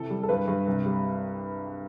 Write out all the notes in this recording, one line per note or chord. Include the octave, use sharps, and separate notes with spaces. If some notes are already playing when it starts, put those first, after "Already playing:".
Already playing: C3 E3 A4
G3
A4
G2 B4
G2
C2
G3